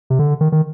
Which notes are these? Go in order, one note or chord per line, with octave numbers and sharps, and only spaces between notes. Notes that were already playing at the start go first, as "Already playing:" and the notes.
C3
D3
D#3
D#3